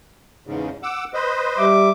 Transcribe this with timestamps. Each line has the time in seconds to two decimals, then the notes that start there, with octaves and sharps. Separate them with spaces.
0.47 E2 G#2 C#3
0.83 F#5 D6 E6
1.14 B4 C5 D#5
1.58 G3 E5 D6